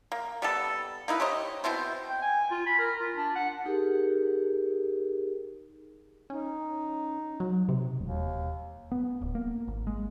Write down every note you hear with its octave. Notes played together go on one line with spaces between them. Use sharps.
A#3
G3 B3 A4
A#3 D#4 E4 B4
G4 C5 C#5 D#5
B2 C4 E4 C5
G5
G#5
F4
B5
A#4
F4
D4
F#5
D#4 G4 G#4 A#4
C#4 D#4
F#3
C3
E1 D#2
B3
D1
A#3
G#1
G#3